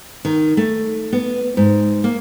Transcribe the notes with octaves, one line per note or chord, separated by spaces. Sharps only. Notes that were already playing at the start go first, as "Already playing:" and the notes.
D#3
A3
B3
G#2
A#3